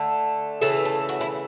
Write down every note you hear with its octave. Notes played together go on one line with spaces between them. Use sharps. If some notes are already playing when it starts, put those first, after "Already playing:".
Already playing: D3 A3
C#3 E3 A3 A4
A4
F#4
E4